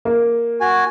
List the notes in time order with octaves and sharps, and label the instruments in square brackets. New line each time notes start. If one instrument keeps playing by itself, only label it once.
[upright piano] A#3
[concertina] F#4 G#5